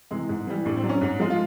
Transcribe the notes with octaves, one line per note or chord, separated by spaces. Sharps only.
C3 E3 G#3
G#2
E3 G3
A2 D4
C4
F#3 D4
C#4
G#2
F3 G#3
F4